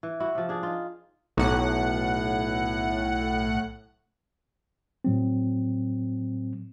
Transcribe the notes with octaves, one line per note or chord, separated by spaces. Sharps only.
E3
E4 F#4
C3 F3
D4 G#4
D#4 F4
B1 A2 F#5
A2 F#3 C4